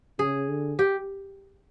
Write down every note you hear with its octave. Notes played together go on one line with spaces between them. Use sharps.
C#3 G#4
D3
G4